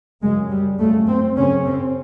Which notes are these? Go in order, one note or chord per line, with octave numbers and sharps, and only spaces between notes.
F#2 C#3 G#3
G3
F#2 C#3 A3
C4
F#2 C#3 C#4
C4